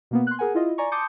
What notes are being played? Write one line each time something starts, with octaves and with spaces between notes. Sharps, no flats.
B2 A#3 B3
C6 F#6
G#4 A#4 F#5 G#5
E4 F4 D#5
D5 G#5 A#5 C#6
A5 C6 D6 D#6 G6 C#7